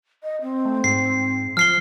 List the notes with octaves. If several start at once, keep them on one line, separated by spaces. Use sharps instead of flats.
D#5
C4
A3
G#2 C7
F3 F6 C7 G7